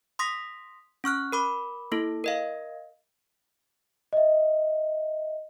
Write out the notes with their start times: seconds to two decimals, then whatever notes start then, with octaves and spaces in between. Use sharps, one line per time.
0.19 C6 D#6 A#6 B6
1.04 C#4 C#6 F6 F#6
1.32 A#4 B5 D6
1.92 A#3 E4 A4
2.24 A#4 D#5 F5
4.13 D#5 E5